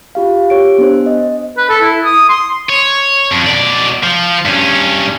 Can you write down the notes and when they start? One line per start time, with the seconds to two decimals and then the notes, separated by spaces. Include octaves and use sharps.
0.15 F4 G4 F5
0.50 G4 C#5 D7
0.78 B3 D4 C5
1.06 D#5
1.57 B4
1.69 A4
1.81 E4
2.05 D#6
2.29 C6
2.69 C#5
3.32 F2
3.47 B2 D5
4.03 F3
4.45 G2 C#4